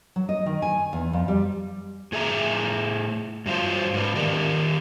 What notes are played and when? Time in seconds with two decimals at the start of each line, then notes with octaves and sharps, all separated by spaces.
0.16 F#3
0.29 D#5
0.46 D#3
0.62 G#5
0.93 E2
1.13 F2
1.28 G3
2.12 A2 G#4 E5 A#5
3.46 G2 F#3 F4 C5
3.94 G#2 B4
4.16 D#3 G4 A#4 D5